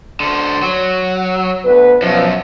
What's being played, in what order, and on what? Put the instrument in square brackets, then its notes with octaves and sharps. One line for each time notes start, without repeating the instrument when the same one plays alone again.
[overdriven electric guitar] D3 C5
F#3
[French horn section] D2 B3 B4
[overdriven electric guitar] F#2 [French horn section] B2 F3